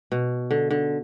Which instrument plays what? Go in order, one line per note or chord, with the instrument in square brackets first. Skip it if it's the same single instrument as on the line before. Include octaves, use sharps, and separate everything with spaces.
[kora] B2
D3
D3